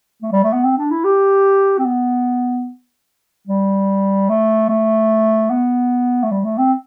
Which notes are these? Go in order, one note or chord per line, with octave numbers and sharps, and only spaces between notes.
A3
G3
A3
B3
C4
D4
E4
G4
C4
B3
G3
A3
A3
B3
A3
G3
A3
C4